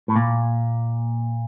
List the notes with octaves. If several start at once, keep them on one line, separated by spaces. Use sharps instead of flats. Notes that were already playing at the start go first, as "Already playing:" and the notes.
A2
A#2